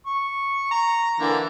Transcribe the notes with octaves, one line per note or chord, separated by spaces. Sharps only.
C#6
A#5
D3 E3 A#3